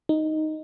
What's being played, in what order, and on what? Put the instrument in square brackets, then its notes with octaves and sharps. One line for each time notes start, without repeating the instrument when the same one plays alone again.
[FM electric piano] D#4